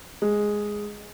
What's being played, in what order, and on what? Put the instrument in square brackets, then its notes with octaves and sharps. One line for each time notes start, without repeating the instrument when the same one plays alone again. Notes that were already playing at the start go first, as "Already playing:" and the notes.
[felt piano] G#3